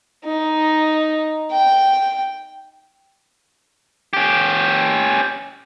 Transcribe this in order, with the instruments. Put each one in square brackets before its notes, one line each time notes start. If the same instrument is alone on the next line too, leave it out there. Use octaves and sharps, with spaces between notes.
[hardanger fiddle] D#4
G5
[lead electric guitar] C#4 G4